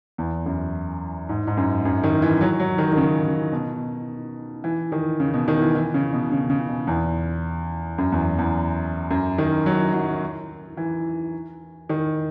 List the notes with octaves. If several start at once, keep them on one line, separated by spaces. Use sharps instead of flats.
E2
F#2
G#2
G#2
F#2
F#2
D#3
E3
F#3
F#3
D#3
D#3
C#3
C#3
B2
E3
D#3
C#3
B2
D#3
E3
E3
C#3
B2
C#3
C#3
B2
E2
F#2
E2
E2
F#2
D#3
F#3
F#3
E3
D#3